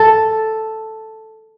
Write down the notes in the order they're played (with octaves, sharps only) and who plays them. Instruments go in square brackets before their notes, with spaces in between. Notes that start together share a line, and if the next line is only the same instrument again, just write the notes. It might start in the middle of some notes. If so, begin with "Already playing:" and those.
Already playing: [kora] A4